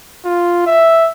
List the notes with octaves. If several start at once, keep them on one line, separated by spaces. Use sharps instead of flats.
F4
E5